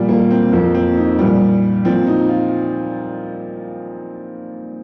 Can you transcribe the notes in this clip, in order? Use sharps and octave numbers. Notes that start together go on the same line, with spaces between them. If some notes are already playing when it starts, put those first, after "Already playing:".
Already playing: A#2 F3 G3
A#3
C4
F2 F3 A#3
C4
D#4
A#2 F3 G3
A#2 F3 C4
D#4
F4